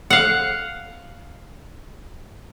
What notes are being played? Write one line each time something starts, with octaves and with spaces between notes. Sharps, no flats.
F5 F#5